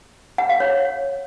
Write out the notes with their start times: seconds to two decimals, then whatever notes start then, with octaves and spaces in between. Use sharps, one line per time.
0.38 F#5
0.49 F5
0.60 C#5